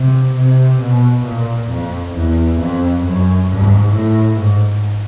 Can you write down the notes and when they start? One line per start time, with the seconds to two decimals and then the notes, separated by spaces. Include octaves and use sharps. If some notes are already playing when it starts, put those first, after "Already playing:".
Already playing: C3
0.36 C3
0.81 B2
1.25 A#2
1.70 F2
2.15 E2
2.59 F2
3.04 F#2
3.48 G#2
3.93 A2
4.37 G#2